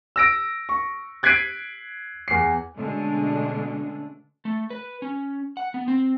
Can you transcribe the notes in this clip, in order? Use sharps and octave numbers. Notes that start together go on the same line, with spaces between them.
E6 A#6 D7
C#6
F#6 G#6 B6 C7 D7 D#7
E2 C7
B2 D3 G#3 A3 C#4 D4
A3
B4
C#4
F#5
B3
C4